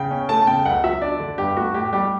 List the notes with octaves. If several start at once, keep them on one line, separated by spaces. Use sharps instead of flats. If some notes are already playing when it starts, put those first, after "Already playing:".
Already playing: C#3 G5
C#4
A3 A5
A5
C#3 G5
C#2 F#5
F#3 E5
D4 D5
D3
G2 G4
A3 F#4
A2 G4
G3 G4